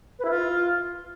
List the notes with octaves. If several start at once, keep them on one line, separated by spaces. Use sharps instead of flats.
B4
E4
F4